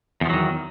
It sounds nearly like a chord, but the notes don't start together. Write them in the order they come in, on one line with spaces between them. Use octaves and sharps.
E2 F3 F#3 D#3